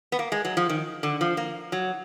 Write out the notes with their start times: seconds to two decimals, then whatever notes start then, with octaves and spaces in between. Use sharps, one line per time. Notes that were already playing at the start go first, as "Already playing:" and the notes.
0.12 B3
0.19 A#3
0.32 G#3
0.45 F#3
0.57 F3
0.69 D#3
1.03 D3
1.21 F3
1.37 A#3
1.72 F#3